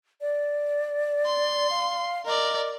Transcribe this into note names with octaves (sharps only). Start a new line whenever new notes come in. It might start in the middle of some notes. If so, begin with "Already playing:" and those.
D5
C6
F5
A#4 D5 D#5